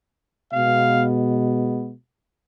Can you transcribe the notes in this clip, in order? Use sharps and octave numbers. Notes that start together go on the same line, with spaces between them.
B2 G#3 B3 F5